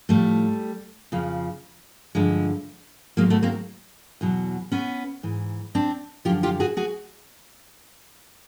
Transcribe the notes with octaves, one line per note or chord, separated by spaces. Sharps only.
A2 F3 G3 A3
F2 C#3 F3
G2 D3 F3 G#3
G#2 D#3 F#3 G#3 A#3
A3 B3
A#3 C4
E2 B2 F#3
B3 C#4
G#2 E3
C4 D4
F#2 D3 F3 F4 G4
F4 G4
F#4 G#4
F#4 G#4